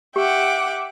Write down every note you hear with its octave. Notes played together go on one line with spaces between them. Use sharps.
G4 E5 F#5 G5 D6